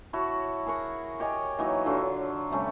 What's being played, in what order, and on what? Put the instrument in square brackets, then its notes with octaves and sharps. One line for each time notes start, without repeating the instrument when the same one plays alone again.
[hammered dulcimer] E4 F#4 C#5 A5
G#4 A#4 F#5 C#6
G4 C#5 D#5 G#5
E3 F#3 A#3 D#4
D3 F#3 F4 A4
C3 G3 A3 C#4